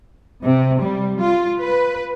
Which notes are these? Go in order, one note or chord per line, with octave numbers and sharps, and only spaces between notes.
C3
G3
F4
B4